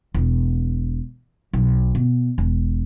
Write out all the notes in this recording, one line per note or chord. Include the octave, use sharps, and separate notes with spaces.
E1
B1
B2
E1